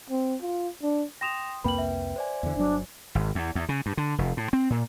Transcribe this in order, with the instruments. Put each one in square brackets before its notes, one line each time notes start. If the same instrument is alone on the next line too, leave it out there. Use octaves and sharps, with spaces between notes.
[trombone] C4
F4
D4
[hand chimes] G5 C6 D#6 [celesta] A#6 E7 F7
[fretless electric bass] C2 F2 A#3 [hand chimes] B4 G5 [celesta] B5 F#7
[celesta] E5
[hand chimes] C5 D5 G#5
[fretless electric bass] E2 D3
[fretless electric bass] G1 F#3 [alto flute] D4
[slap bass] G#1
E2
E2
C#3
G2
D3
F1
A2
C4
A#2